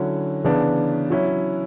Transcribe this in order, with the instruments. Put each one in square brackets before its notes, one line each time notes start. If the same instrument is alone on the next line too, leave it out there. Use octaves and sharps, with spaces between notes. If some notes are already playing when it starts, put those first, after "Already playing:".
Already playing: [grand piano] D3 F#3 C#4 E4
C#3 E3 B3 D4
F#3 C#4 E4